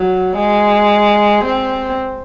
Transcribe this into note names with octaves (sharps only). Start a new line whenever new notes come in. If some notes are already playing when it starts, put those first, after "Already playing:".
Already playing: F#3
G#3
C4